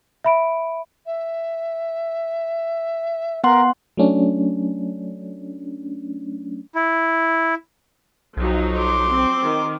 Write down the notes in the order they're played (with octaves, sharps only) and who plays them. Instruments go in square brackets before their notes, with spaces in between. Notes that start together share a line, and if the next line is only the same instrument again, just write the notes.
[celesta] E5 B5 D7
[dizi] E5
[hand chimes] B3 F#5 C6 [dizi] A#4
[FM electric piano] F#3 A3 C#4 D4
[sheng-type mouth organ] E4
[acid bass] B1 [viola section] F3 F#3 D#4
[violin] C6 D6
[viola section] C4
D#3